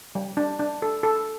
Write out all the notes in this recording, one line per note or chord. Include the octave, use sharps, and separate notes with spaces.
G3
D4
D4
A4
A4